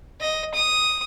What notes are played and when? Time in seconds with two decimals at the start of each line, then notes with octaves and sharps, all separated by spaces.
0.21 D#5
0.54 D#6